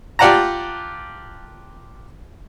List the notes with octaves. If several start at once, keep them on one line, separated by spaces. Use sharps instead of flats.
F4 G4 D5 F#5 A5 A#5